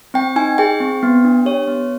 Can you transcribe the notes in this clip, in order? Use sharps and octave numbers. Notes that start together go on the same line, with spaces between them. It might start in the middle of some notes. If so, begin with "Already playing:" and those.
C4 G5
D#4 G#5
G#4 G5
C4
B3
D4
G4 C#5
B3